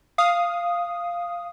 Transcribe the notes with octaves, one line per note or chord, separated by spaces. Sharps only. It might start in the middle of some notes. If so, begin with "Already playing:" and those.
F5 D#6